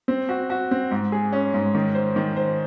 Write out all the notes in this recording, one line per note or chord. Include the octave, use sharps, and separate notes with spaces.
C4
F#4
F#4
C4
G#2
G#4
C#4
G#2
D#3
C5
D#3
C5